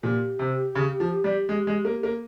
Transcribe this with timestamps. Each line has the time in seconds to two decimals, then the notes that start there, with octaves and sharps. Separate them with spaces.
0.03 A#2 G4
0.39 C3
0.75 C#3
1.00 F3
1.24 G3
1.49 G#3
1.67 G#3
1.85 A#3
2.03 A#3